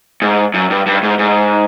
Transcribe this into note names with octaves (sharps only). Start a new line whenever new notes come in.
G#2
F#2
G2
G2
G#2
G#2